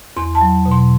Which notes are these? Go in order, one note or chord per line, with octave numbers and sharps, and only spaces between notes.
E2 C6
A5
F#3
B2
C6